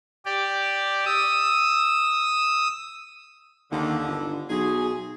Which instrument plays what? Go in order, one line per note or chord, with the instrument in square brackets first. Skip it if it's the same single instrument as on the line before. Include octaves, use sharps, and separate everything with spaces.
[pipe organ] G4 D5
D#6 E6
[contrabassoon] D#2 [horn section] D3
[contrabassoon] G1
[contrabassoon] B1 [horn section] G#4